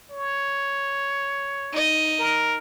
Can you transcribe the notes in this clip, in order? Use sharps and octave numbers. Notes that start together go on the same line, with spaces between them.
C#5
D#4 D#5
A#4